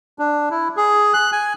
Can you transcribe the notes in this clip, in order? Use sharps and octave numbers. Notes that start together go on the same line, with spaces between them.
D4
E4
G#4
F#6
G#5